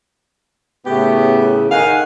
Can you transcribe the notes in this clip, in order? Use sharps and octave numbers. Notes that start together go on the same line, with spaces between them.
A2 C#3 A3 B3 G4
D#3 F5 F#5 G#5